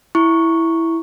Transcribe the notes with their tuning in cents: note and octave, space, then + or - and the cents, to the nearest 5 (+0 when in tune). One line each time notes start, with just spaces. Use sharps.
E4 +0 C#6 +0